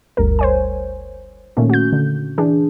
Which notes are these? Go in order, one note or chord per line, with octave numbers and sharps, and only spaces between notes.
G1 D2 G3 A#4
C5 C#5 G#5
A#2 D#3 A3 C#4
F#4 G6
D3
E3 D4 G#4